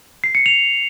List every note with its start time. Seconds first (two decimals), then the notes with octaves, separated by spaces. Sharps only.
0.24 C7
0.35 C#7
0.46 F7